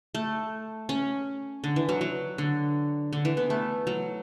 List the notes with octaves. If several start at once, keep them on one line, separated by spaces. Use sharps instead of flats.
A3
C#4
D3
E3
F#3
F#3
D3
D3
E3
B3
A3
F#3